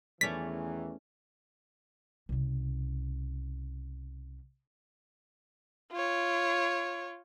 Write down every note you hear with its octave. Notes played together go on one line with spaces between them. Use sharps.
E2 D#3 E3 A3 C#4 D5 B6
C2 C#3
F4 C#5